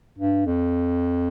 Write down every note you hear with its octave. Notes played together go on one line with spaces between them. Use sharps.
G2
F2